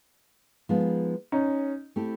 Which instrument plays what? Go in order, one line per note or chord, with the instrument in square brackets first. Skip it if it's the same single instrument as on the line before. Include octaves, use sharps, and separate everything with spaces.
[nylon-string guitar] F3 G#3 B3 D#4
[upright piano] C#4 D#4
[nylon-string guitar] A3 C4 E4 G4